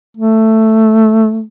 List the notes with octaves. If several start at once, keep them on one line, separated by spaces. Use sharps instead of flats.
A3